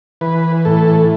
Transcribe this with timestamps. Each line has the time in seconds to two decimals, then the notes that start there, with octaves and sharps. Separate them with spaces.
0.21 E3 B4
0.65 A2 A4